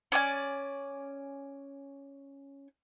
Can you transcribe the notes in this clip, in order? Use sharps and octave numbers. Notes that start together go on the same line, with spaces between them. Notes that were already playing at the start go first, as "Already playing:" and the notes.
C#4 D5 G#5